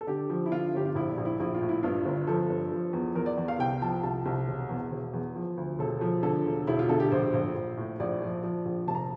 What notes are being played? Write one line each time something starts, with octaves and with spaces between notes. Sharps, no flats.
A4
D3 G4
F3
E4
D3 F4
G1 G4
F4
A#1 E4
D4
A#1
E4
A#1 E4
F4
A2
E4
G2 F4
G1
F3 A4
G2
F3
E2
E2 A#4
D5
E2
F5
C2 G5
F3 A5
C2 A5
C2
E1
E2
E1
E2
F3
D2
E1 A4
F3
D3 A4
E1
E1 E4
F4
D3 A4
G4
A#1 C5
A#1
A#1
A2
A#1 D5
F3
F3
A#1
F1 A5
A#5